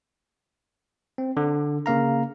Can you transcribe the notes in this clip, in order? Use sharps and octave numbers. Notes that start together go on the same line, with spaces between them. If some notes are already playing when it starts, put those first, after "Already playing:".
C4
D3
C#3 A#3 F5 A#5